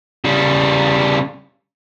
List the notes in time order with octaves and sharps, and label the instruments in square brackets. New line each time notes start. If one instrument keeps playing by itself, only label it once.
[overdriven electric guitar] C#3 G3